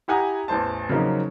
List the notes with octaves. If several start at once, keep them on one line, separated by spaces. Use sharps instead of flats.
E4 G4 F#5 G#5 A#5 D#6
A1 E2 C5 A5
C#3 F3 F#3 A#3 C#4 D#4